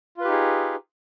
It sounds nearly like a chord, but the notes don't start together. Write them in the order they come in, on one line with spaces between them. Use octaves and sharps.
F4 B4 G4 D#4 G#4